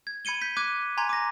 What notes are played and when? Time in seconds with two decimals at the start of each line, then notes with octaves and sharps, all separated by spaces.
0.07 G#6
0.25 B5 G#6 C#7 D#7 G7
0.42 G6 B6
0.57 D6 F#6 G#6 D#7
0.97 G#5 A#5 C6 G#6
1.09 D6 A#6